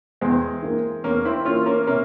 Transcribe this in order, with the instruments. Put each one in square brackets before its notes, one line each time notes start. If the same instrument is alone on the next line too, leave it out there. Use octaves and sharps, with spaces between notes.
[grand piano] E2 [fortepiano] G#3 C4
[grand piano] E3 A#3
[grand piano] E2 [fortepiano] A#3 C#4
[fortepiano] C4 E4
[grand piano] E3 A#3 [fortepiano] C#4 F4
[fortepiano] A#3 C#4
[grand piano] C3 [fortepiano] A#3 C#4